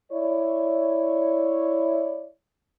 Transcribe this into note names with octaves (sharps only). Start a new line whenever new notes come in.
E4 C#5 D5